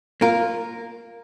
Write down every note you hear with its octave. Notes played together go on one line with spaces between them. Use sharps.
A#3 F4 A#4